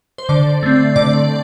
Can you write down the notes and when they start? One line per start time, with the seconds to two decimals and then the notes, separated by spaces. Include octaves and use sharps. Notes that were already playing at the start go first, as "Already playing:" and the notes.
0.18 C5
0.29 D3 D5
0.63 A3 C4
0.96 D3 D5